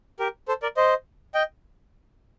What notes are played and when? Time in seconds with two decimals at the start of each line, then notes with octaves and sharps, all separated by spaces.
0.19 G4 A#4
0.48 A4 C5
0.62 A#4 D5
0.77 C5 D#5
1.34 D#5 G5